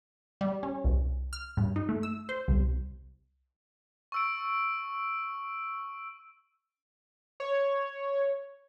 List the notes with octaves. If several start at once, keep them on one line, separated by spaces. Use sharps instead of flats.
G3
C#4
C2
F6
G2
D#4
A3
E6
C5
C2
C#6 E6 D7
C#5